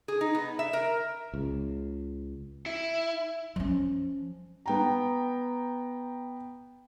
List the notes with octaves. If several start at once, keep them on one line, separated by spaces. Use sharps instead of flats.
G#4
D#4
B3
E5
A#4
C#2
E4
F3 C#4
B3 G5 A#5